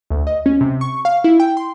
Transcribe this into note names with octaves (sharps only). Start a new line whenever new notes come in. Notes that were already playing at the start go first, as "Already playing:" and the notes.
D2
D#5
C#4
C3
C#6
F5
E4
G5
C6